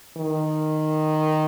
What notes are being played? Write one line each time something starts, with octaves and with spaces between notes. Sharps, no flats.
D#3